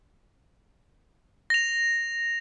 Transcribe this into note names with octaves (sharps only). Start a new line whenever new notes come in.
A#6 F7